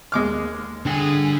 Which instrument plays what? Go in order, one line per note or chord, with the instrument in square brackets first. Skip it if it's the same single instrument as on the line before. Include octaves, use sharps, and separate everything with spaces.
[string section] D#2 [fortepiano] G#3 D6 F6
[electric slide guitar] D3 [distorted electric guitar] D4 G5 [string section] G#4